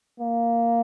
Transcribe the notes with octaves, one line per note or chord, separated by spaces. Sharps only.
A#3